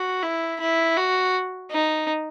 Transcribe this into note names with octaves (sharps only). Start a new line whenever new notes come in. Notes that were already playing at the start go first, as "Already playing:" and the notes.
Already playing: F#4
E4
E4
F#4
D#4